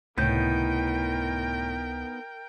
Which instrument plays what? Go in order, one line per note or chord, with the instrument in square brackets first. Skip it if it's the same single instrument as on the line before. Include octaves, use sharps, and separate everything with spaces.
[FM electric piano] C#2 C3 [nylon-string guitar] A2 [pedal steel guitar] B3 D#4 G6 [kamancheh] A#4 G5